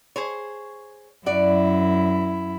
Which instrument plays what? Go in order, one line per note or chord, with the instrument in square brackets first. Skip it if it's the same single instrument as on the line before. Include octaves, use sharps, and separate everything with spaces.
[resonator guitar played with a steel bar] G#4 C5 C#5
[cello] F#2 E4 [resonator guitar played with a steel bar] F#4 D5